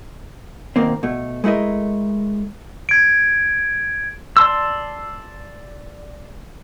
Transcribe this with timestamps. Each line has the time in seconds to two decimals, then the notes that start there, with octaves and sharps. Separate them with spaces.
0.76 B2 D#3 A#3 C4
1.03 B2 A3
1.44 G#3 A3 E4 A#4 D#5
2.89 G#6 D7
4.37 D5 A5 C6 E6